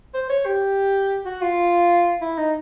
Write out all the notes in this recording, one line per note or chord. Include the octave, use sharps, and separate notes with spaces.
C5
C#5
G4
F#4
F4
E4
D#4